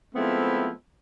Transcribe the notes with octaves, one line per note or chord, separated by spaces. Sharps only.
F3 G#3 A3 B3 C4 E4